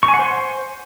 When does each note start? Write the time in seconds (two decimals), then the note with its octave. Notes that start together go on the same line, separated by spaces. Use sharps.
0.03 C#6
0.08 G#5
0.14 F#5
0.19 C5